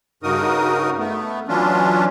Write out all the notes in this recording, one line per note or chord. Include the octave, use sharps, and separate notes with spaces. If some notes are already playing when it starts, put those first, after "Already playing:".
G2 C#3 D#4 F#4 A#4 D#6
A3 B3
E3 F#3 C#4 D4 F4